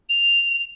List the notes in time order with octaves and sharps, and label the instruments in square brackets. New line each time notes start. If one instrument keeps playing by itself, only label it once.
[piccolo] F7